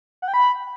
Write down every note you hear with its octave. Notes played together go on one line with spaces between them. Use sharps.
F#5
G5
B5